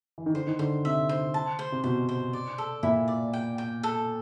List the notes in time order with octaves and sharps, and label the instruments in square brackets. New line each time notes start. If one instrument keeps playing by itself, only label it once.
[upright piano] E3
D#3
[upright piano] D3 [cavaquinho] C5
[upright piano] D#3
[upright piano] D3 [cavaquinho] C5
[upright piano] C3 [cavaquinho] E5
[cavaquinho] C5
A5
C5
[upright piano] C3
[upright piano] B2 [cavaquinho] C5
[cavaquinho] C5
D5
A4
[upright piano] A#2 [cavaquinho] E4
[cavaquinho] D5
G5
G5
A4